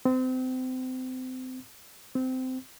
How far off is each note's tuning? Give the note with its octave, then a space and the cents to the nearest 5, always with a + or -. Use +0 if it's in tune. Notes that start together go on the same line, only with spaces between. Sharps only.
C4 -30
C4 -20